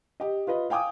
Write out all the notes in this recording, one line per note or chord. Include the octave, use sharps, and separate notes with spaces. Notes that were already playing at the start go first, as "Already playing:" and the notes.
G4 D#5
F4 B4 D#5
F5 G5 G#5 D6 D#6